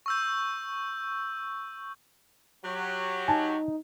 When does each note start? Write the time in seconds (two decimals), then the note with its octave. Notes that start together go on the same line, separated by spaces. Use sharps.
0.06 C#6 E6 G6
2.65 F#3 G4
3.28 D#4 G#5 A5